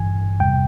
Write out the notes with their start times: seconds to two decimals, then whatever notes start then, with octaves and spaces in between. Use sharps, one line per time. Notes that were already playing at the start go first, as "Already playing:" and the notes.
Already playing: G#1 G2 E3 G#5
0.40 E2 C3 G3 G5